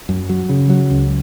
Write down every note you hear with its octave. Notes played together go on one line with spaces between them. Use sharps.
F#2
F#3
C#3
F#3
C#2